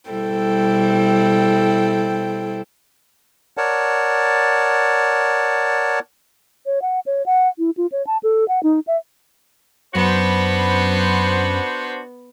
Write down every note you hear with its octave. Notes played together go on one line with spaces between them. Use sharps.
B2 G3 E4 A4 C5 G5
A#4 C#5 D5 F#5 A5
C#5
F#5
C#5
F#5
E4
F4
C#5
A5
A4
F#5
D#4
E5
F#2 B3 D4 F#4 C5 B5